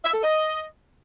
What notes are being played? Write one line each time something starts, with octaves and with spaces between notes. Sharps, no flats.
E5
A4
D#5